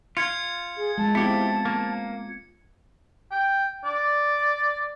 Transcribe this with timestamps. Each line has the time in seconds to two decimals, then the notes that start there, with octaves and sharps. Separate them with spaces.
0.17 F4 G#6 C#7
0.77 G#4
0.98 G#3 A5
1.15 B3 C4 E4 F4 G4 C#7
1.65 A#3
3.32 G5
3.85 D5